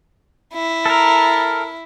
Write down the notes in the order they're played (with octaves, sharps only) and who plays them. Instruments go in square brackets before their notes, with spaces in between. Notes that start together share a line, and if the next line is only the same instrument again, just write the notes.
[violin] E4
[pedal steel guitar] A4 A#4